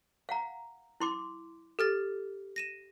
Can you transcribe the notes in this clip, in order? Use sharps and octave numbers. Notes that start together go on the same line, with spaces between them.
F5 F#5 A#5
E4 C6 D6
G4 A4 F6 A6
A#6 D#7 E7